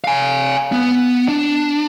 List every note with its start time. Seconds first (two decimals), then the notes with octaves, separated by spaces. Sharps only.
0.04 F5 G#5
0.72 B3
1.28 D4